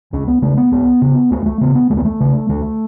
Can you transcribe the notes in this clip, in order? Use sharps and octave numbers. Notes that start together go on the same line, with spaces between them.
C#2 C#4
B3
C#3 A3
B3
C#2 B3
C#3
C#2 A3
A3
C#3 B3
B3
D2 A3
B3
A3
C#3
D2 A3